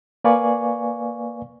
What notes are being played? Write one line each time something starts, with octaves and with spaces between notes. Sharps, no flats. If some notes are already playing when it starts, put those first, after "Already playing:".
A#3 B4 D5 F5 G#5 C#6